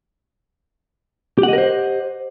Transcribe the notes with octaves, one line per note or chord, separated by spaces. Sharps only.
G4 A#4 C5 D#5 F#5